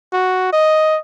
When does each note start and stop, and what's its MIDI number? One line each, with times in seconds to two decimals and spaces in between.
0.13 0.50 66
0.53 0.99 75